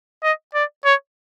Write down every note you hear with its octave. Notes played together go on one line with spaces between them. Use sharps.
D#5
D5
C#5